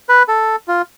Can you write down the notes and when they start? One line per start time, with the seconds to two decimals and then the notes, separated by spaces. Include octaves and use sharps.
0.09 B4
0.28 A4
0.68 F4